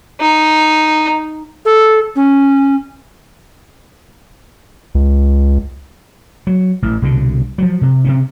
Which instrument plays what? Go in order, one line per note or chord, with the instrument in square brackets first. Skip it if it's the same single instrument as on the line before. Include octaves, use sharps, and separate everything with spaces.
[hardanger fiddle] D#4
[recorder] A4
C#4
[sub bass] C#2
[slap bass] F#3
A1 E3
C2 B2 D3
F3 F#3
C3
C3 C4 C#4